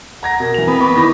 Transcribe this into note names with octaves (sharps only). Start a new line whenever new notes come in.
F#5 A#5 G#6 A#6
B2 A#4
E3 F7
B3 C4
C#6 D6
D#3 E4 A#6